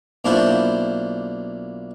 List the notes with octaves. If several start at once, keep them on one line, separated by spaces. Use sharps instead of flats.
B1 A#3 D4 E4 F4 C5